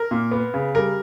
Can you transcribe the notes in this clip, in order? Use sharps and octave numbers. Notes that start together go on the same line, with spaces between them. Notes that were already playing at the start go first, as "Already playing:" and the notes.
Already playing: A#4
A#2
B3
C#3
G3 A#4